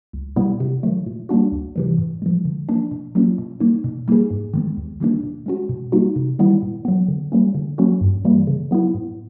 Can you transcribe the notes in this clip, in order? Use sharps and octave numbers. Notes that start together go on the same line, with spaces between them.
C#2
B2 G3 B3 E4
C3
D#3 F#3 A3
A#2
G3 A#3 D4 F#4
D2
C3 E3 G3
A2
F3 G#3
D3
F3 A#3 D4
B2
F#3 A#3 C#4 F4
B2
G3 A#3 D#4
B2
G3 A#3 D#4 G#4
G#2
D#3 G#3 B3
D#2
D#3 G3 A#3 D4
B2
G#3 C#4 F#4
B2
G3 A#3 D#4 F#4
C3
D#3 G3 B3 E4
A#2
F#3 B3
D3
G3 A#3 C#4
D3
F#3 A#3 C#4 F#4
G2
E3 G3 A#3
C#3
F#3 B3 E4
A2